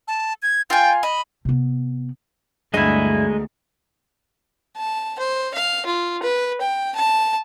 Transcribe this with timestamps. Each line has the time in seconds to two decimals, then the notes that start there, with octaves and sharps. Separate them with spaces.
0.08 A5
0.43 G#6
0.70 F4 G5 G#5
1.03 D#5 B5
1.45 C3 B3
2.74 D2 G2 G#3 B3 D#4 E4 G#4 D#5
4.76 A5
5.19 C5
5.54 F5
5.86 F4
6.22 B4
6.61 G5
6.96 A5